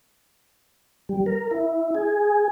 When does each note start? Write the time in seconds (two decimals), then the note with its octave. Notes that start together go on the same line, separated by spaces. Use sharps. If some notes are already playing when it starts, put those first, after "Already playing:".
1.09 G3
1.26 A#4
1.51 E4
1.95 G#4